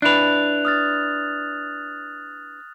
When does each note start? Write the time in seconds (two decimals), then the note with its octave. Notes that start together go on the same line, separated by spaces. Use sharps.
0.02 D4 E4 B4 F#6 F7
0.65 D#6 F6 A6